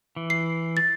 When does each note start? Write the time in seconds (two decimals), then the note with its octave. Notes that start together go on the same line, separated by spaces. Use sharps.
0.16 E3
0.30 C7
0.77 A6